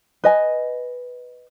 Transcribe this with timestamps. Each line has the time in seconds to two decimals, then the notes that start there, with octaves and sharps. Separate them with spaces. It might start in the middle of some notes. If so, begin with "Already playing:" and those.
0.24 B4 D#5 G#5